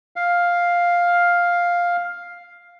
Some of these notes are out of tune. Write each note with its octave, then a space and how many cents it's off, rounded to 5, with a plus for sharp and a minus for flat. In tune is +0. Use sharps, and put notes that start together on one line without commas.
F5 +5